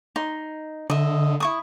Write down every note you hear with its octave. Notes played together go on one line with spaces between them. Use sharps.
D#4 C6
D3 D#5 E5
E4 C#6 D#6